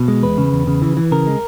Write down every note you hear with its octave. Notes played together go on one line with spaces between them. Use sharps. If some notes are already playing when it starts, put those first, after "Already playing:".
Already playing: B2
G#3
E2 B4
C#3
E2
C#3
E3
E3
C#3 A#4
G#3